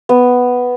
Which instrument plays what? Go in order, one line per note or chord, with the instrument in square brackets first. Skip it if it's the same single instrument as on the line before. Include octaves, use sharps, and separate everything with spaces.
[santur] B3